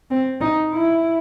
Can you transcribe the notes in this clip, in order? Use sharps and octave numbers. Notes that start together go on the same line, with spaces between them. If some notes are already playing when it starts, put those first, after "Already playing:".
C4
D#4
E4